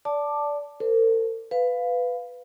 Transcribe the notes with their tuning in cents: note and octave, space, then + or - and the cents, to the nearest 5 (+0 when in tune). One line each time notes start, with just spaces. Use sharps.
D5 -15 A5 +0 D6 +10
A4 +45 C5 -35
B4 +15 F5 +0